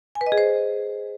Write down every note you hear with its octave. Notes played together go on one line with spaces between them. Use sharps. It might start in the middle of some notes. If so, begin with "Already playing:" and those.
G#5
B4
D#5
G#4
C5